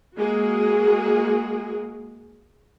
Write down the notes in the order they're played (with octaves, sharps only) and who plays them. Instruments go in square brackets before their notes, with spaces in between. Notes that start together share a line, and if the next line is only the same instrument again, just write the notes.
[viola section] G#3 A#3 F#4 G#4